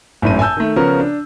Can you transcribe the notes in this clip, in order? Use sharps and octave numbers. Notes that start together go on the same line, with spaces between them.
G#1 F#2 A2 D#7
G#5 A5 E6 G6
D#3 A3
C#3 F3 B3 C#4 A#4
D4